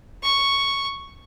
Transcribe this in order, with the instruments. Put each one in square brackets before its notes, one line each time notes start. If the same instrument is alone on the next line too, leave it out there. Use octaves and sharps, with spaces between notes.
[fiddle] C#6